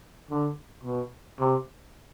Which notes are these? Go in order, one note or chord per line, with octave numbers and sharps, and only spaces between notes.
D3
B2
C3